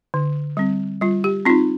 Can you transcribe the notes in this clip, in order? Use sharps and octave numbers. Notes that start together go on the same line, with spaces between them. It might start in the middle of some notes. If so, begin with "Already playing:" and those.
D3
G3 C4
G3 F4
G4
C4 D#4 F4